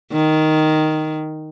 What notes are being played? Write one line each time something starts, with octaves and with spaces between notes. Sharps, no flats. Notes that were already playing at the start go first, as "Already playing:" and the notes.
D#3